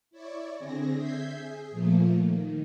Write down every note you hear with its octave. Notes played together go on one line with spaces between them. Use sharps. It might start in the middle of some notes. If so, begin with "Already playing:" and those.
E4 C#5 D5
D3 C4 G#4 A#6
E5 G6 G#6 B6 C7
G#4
A#2 F3 A3 A#3
D#3